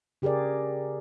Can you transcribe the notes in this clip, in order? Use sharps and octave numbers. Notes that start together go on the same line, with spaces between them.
C#3 G4 G#4 A#4 D5